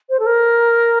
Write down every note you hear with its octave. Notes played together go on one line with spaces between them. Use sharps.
C5
A4
A#4